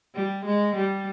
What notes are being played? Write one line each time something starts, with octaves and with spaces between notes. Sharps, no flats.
G3
G#3
G3